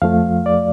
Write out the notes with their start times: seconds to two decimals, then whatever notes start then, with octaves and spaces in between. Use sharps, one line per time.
0.02 F2 F3 A3 F5
0.46 D5